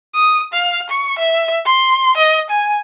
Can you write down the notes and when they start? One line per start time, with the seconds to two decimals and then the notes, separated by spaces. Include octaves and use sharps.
0.15 D#6
0.53 F5
0.90 C#6
1.19 E5
1.66 C6
2.17 D#5
2.50 G#5